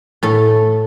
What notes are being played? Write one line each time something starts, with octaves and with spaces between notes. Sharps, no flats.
A2 A4